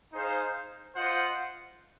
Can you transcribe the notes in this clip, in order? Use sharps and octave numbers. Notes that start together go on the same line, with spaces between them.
D#4 G#4 C5 F5
F4 C5 D#5 F#5